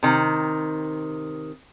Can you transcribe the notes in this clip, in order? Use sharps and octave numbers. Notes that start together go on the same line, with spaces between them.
C3 D#3